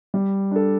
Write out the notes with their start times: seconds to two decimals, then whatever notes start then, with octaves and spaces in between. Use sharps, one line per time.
0.14 G3
0.51 D4 A4